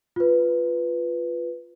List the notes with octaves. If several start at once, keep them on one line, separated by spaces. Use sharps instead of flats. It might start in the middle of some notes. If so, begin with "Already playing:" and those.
F4 B4